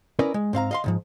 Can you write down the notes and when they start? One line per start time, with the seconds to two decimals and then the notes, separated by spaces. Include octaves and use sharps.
0.19 C#4 E4 A#4 B4 D5 D#5
0.34 G#3
0.53 G#2 C4 F5 A#5
0.71 D#5 F5 C6
0.84 C#2 G#2 F3